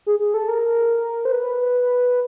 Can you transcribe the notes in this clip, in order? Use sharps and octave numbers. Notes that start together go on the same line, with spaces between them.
G#4
G#4
A4
A#4
C5
B4